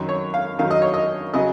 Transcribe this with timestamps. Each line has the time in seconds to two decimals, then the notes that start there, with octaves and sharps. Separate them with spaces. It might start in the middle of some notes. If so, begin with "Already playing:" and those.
Already playing: F#2 D#3 F#3
0.09 C#5
0.34 F5
0.59 F#2 D#3 F#3 F5
0.71 D#5
0.82 C#5
0.94 D#5
1.34 C#3 F#3 D#5